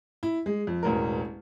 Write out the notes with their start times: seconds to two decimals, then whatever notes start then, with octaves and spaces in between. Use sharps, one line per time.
0.23 E4
0.46 G#3
0.67 F2
0.83 E1 A1 A#4